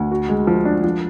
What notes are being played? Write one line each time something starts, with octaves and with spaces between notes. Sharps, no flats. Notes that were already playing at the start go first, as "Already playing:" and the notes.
Already playing: D2
F#4
G#3
F3
D4
F3